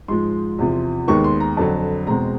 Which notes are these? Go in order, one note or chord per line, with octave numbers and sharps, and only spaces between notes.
G#2 F3 G#3 C6
E2 C3 F3
D#2 D#3 G#3 B3 C#6
C6
A#5
F2 D3 F#3 A5
E2 B2 G#3 C4 A#5